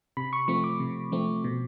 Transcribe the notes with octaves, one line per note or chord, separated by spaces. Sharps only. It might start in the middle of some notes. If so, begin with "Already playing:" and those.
C3 B5
C#6
F3 A3 C4 C#6
D6
C3
F3 A3 C4
B2